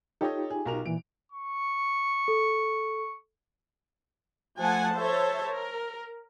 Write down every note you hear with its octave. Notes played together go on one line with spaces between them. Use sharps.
D#4 F4 G4 A4 C#5 D#5
G#4
B1 A#4 F7
A#2 E3 D7
C#6
A4
F3 A3 F#5 G#5 A5
A4 C5 C#5 E5 A5
A#4